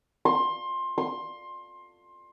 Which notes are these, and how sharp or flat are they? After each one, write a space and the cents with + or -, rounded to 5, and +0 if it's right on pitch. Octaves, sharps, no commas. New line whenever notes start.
C6 +20
C6 +20